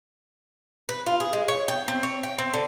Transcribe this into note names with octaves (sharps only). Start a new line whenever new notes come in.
B4
F4
G#4
G#3
C#5
G5
C4
C#5
G5
C4
D3